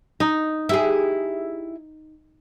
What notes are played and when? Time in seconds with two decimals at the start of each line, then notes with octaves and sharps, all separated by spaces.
0.20 D#4
0.69 E4 G4 G#4